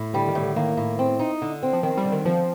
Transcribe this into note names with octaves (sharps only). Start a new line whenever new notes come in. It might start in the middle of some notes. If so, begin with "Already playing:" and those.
Already playing: A2
D3 G3
D#3
A2
D3
D#3 A#3
A2
C4
D#4
D3
C4
F3
D#3 C4
G3
D3
D#3
F3 C4